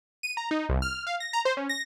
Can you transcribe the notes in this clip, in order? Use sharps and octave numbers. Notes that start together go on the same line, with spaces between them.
D#7
A#5
D#4
C2
F6
F5
A#6
A#5
C5
C#4
A#6